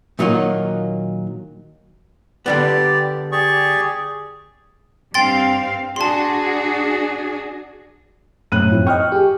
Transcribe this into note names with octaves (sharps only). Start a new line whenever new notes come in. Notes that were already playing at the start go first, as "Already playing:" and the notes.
A#2 D#3 F#3 A#3 D#4 F4
D3 G3 B3 G4 D5
G4 G#4 D5 C#6
G2 C4 F5 G5 C6 A6
D4 F#4 G#4 A5 C6
F#2 A2 F#6 D#7
F2 E4 F4
D#5 G5 C#6 F6
G4 G#4